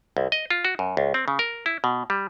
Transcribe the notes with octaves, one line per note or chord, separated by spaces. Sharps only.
C2
D#5
F4
F#4
F#2
C#2
C4
C#3
A#4
E4
B2
G3